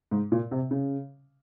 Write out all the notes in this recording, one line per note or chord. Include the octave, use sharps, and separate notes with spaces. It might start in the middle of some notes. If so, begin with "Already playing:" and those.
G#2
A#2
C3
C#3